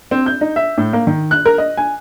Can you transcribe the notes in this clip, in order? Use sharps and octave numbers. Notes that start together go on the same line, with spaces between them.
C4
G6
D#4
E5
A2
A#3
D#3
F#6
A#4
D#5
G#5